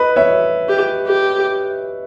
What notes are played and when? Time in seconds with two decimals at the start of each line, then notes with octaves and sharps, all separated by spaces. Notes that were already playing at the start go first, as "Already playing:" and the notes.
Already playing: B4 D#5
0.16 C#5 E5
0.69 G4
1.07 G4